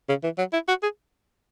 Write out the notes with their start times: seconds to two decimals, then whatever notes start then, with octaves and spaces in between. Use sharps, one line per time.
0.09 C#3
0.23 E3
0.38 F#3
0.53 E4
0.68 F#4
0.83 G#4